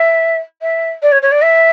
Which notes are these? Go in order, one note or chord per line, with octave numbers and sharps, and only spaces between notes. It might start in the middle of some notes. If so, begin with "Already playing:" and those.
Already playing: E5
E5
D5
C#5
C#5
D5
E5